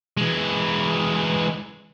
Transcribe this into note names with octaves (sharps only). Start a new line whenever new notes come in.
E3 G#3